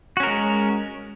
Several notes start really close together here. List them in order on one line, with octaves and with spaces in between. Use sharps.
F#4 C#4 A#4 G#3